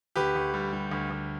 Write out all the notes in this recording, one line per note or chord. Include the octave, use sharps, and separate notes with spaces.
D2 G4 B4
D2
G3
G3
D2
D2